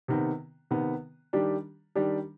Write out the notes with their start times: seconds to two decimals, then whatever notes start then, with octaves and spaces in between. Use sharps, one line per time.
0.08 C3 D#3 B3
0.71 C3 D#3 B3
1.33 D#3 G3 D4 G4
1.95 D#3 G3 D4 G4